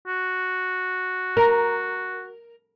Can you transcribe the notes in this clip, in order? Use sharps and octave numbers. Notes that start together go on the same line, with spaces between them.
F#4
A#4